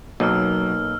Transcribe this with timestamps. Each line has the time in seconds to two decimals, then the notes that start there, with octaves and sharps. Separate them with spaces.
0.20 B1 F#3 A#3 D#4 E6 F6